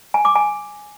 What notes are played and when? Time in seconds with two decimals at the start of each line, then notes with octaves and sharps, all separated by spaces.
0.14 G#5
0.25 D6
0.36 G#5